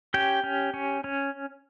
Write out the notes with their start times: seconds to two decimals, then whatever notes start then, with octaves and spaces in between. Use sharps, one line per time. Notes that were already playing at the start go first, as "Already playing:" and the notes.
0.14 C#4 G4 G5
0.44 C#4
0.74 C#4
1.04 C#4